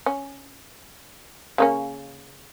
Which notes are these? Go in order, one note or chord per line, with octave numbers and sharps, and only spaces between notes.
C#4
C#3 A#3 C#4